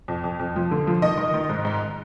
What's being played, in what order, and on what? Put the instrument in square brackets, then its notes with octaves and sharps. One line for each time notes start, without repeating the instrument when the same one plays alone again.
[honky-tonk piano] F2
F2
F2
F3
D3
F3
D#3 D#5
D#3
D#3
G#2
G#2